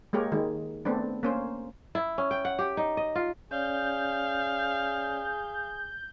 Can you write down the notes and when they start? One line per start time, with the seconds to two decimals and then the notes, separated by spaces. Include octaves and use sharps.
0.13 G#3 A#3 G4 A#4 C#5
0.32 D#3 G#3
0.85 A3 B3 C4 D4
1.23 A#3 C#4 C5
1.95 E4
2.18 C#4
2.31 G5
2.45 F#5
2.59 G4
2.77 D#4
2.97 D#5
3.15 F4
3.51 C#4 G#4 C#5 D5 F5 G6